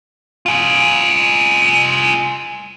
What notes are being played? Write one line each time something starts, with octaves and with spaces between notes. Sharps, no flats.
F4 G#4